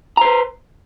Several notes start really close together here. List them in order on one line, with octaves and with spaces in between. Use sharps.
A#5 C5 B4